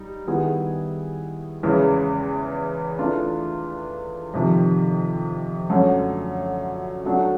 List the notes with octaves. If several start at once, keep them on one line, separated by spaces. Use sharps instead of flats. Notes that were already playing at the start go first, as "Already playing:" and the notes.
Already playing: G3 D#4
D#3 G3 B3 E4 G#4
E2 C#3 E3 G#3
E3 A3 D4 F4
F2 C3 D#3
F#2 D3 F#3 A3 C#4
F#3 A3 D4 F#4